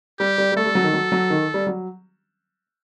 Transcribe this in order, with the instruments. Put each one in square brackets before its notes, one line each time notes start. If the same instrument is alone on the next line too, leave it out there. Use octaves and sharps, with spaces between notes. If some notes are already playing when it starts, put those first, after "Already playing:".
[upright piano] G3 [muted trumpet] G4
[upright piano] G3
G3
[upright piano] A3 [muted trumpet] A4
[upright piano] G3
F#3
D#3
F#3
F#3
D#3
G3
F#3